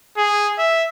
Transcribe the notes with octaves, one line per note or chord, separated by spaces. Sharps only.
G#4
E5